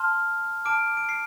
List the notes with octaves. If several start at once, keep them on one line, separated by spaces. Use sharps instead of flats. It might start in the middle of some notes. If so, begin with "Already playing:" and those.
Already playing: A5 C6 F6
A5 D6 F6 D7
D7
C7